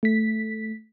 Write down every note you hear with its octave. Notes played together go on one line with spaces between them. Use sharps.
A3 B6